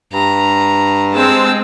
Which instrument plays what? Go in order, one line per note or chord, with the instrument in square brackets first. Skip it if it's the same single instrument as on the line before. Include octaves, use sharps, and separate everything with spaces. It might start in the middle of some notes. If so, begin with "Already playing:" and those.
[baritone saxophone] G2 [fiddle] A#5
[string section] G#3 C4 [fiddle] A5 E6